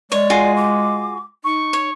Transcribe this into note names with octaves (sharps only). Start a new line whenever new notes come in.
G#3 C#5 D5
F4 F#4 G#4
D6
D#4 C#6
C#5